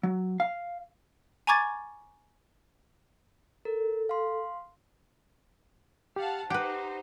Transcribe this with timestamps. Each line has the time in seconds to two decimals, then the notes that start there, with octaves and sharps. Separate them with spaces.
0.03 F#3
0.40 F5
1.47 G#5 A#5 C#6 D6 G#6 A6
3.65 A4 A#4
4.09 F5 C6
6.16 G4 F5 F#5 A5
6.50 D#4 G4 B4 C5 F#5